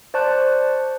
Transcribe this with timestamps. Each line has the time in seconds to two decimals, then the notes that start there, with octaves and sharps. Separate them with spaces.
0.14 C5 D5 A5 C#6 F#6